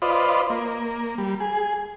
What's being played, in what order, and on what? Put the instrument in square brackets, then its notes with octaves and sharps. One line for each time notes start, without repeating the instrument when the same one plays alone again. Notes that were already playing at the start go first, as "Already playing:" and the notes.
[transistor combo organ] F4 B4 C5 D5 D#5
A#3
G3
G#4